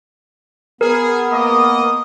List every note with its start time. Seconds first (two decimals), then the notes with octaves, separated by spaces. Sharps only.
0.81 B3 G#4 A#4
1.31 A#3 D#5 D#6